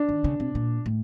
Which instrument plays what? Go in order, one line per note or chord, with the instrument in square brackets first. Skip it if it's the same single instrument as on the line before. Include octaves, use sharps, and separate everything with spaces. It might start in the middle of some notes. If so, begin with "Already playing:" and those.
Already playing: [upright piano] D4
[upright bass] D#3
C#3
C3
A#2
A2